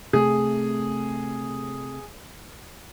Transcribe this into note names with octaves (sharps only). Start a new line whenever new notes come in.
C3 A3 G#4